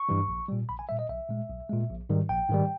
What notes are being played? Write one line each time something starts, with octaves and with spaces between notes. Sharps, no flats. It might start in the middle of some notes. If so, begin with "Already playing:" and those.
Already playing: C#6
G2 E3 G3
A#1
A#2 G3
A#1 B5
G#5
A#2 G3 E5
D#5
B1 E5
A#2 G#3
B1
A#2 G#3
A#1
G#2 D#3 G3
A#1 G5
G#2 D#3 G3